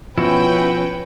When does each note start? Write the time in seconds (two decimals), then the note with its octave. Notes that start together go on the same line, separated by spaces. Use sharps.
0.18 B2 F3 C#4 E4 F#4 B4 G5